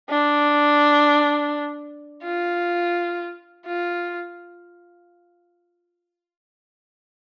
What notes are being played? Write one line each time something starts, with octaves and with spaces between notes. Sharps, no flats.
D4
F4
F4